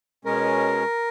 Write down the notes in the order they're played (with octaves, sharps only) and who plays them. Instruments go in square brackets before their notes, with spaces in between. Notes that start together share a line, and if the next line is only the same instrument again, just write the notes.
[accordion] B2 G#3 C#4 [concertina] A#4